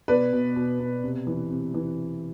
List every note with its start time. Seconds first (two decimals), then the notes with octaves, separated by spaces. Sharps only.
0.08 B2 B4 D5
0.33 B2
0.56 B2
0.80 B2
1.04 C3
1.27 E3
1.51 C3
1.74 E3